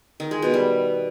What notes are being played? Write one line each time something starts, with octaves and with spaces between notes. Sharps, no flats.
D#3
G#3
B2
G3